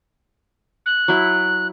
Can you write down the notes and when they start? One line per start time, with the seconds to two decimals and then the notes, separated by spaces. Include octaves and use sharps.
0.86 F#6
1.08 F#3 E4